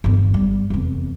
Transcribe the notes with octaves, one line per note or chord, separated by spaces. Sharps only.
G1 E2
G3
F1 E2